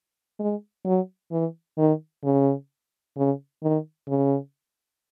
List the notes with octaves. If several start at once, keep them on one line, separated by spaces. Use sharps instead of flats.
G#3
F#3
E3
D#3
C#3
C#3
D#3
C#3